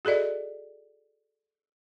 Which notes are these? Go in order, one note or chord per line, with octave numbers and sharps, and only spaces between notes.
F#4 G#4 A4 D5 D#5